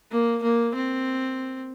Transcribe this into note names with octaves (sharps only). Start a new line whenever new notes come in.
A#3
A#3
C4